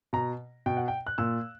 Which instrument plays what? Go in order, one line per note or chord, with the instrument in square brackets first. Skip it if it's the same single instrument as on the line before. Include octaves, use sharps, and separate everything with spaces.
[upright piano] B2 A#5
B2 G5
F#5
G5
F#6
A#2 E6